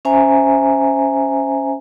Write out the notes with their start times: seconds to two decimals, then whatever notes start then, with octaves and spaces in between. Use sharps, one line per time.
0.05 C#4 C5 E5 G#5 A#5